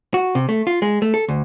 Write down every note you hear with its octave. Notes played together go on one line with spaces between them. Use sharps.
F#4
C3
A3
F4
G#3
A3
A4
D2